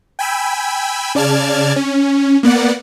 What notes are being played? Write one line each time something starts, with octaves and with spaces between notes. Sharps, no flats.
G5 G#5 B5 E6
C#3 D5 A5 F6 G#6
C#4
A#3 B3 D5 F#5